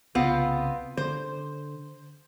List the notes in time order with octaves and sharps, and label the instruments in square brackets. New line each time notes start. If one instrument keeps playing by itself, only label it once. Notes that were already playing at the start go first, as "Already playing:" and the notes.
[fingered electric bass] C2 C#3 [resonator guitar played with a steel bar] B3 C4 F4
[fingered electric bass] D3 [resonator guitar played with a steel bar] C5